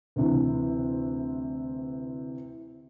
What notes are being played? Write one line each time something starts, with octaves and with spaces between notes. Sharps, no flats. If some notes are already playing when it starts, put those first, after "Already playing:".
D2 C3 E3